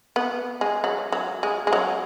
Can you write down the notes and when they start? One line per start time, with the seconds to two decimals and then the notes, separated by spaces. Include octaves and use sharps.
0.16 B3
0.61 G#3
0.84 F#3
1.12 F#3
1.43 G#3
1.67 G#3
1.73 F#3